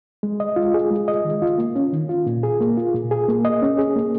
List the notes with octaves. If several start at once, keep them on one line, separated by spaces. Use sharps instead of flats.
G#3
D#5
F4
G#4
G#3
D#5
D#3
F4
A#3
C#4
D#3
F4
A#2
G#4
A#3
F4
A#2
G#4
A#3
D#5
C#4
G#4
A#3